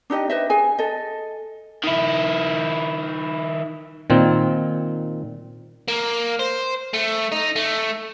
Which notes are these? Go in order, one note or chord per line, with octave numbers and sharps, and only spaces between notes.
D4 D#4 G4 D#5
B4 C5 D#5 E5
G#4 G#5
A4 D#5
D#3 E4
A#2 D#3 C4
A#3
C5
A3
D#4
A3